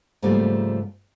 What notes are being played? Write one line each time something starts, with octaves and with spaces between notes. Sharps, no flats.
G#2 C#3 F3 G3 A3 A#3